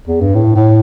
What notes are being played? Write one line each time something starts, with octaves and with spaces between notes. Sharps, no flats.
E2
G2
A2
A2